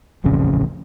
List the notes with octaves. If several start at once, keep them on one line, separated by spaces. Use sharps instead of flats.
D#1 A1 F2 C#3